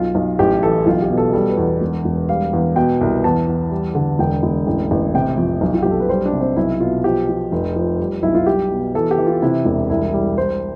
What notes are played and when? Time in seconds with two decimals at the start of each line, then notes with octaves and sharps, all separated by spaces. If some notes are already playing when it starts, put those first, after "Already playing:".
Already playing: B1 F4
0.15 B1
0.39 A1 G4
0.62 E3 A4
0.86 B1 F4
1.02 G4
1.10 B2
1.17 A4
1.33 G3 A4
1.50 B4
1.57 E2
1.81 E1
2.05 E1
2.29 G3 F5
2.53 E2
2.76 B2 G5
3.01 C2
3.24 E2 A5
3.48 E2
3.71 G3
3.95 D3
4.19 E1 G5
4.43 E1
4.67 A1
4.91 A1
5.14 C3 G5
5.37 F2
5.61 B1
5.74 F4
5.82 B1 G4
5.91 A4
6.00 B4
6.09 G3 C5
6.26 D4
6.33 C3
6.41 C4
6.56 B1 E4
6.81 B2 F4
7.04 F3 G4
7.29 F3
7.52 F1
7.76 F3
7.99 G3
8.23 B1 E4
8.35 F4
8.46 G3 G4
8.71 B2
8.95 E3 A4
9.11 G4
9.18 E3
9.26 F4
9.42 C3 E4
9.65 E1
9.90 C2 E4
10.13 G3
10.37 G3 C5